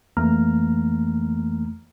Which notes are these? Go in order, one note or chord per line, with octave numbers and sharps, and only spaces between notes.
F2 E3 A3 A#3 A#5 F6